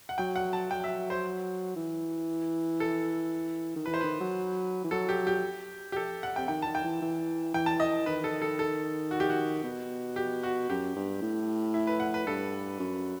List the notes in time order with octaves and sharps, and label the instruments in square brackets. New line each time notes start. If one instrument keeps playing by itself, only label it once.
[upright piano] F#5
[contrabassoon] F#3 [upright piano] G5
[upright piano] F#5
A5
[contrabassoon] F#3 [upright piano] G5
[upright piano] E5
C5
[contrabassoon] E3
[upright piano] A4
[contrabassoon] D#3
[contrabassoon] E3 [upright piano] B4
[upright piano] C5
[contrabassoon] D#3 [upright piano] B4
[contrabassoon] F#3
E3
[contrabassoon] F#3 [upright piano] A4
[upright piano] G4
G4
G4
A4
F#5
[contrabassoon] C3 [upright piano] G5
[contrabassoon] D#3 [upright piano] G5
[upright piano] A5
[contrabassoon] D#3
[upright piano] G5
[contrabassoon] E3
E3
[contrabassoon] E3 [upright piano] G5
[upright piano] A5
D#5
[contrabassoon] D#3 [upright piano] B4
[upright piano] A4
A4
A4
F#4
G4
F#4
[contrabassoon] B2
[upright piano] G4
F#4
[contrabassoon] F#2 [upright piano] G4
[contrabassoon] G2
A2
[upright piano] E4
B4
F#5
B4
[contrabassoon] G2 [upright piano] A4
[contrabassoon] F#2